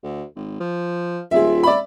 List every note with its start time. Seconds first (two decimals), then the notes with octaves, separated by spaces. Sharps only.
0.03 D2
0.36 G#1
0.60 F3
1.31 D#1 F4 G#4 E5
1.63 D5 E5 B5